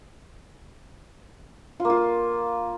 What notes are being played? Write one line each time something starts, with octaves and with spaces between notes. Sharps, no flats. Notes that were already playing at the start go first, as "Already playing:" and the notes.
F4
A#3
F4